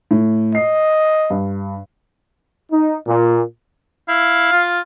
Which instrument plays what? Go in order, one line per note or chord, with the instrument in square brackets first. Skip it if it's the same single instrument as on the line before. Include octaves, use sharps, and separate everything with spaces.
[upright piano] A2
[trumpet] D#5 [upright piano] C7
[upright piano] G2
[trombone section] D#4
A#2
[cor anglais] E4 [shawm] F5
[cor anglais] F4